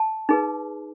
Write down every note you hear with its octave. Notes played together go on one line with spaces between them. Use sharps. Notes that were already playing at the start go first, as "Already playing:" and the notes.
Already playing: A5
D#4 G#4 B4